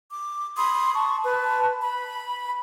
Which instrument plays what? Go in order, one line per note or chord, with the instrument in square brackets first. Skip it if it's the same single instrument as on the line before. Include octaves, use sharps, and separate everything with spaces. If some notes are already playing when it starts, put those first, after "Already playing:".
[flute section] D6
B5 C6 D#6
A5 C#6
B4 A5
B5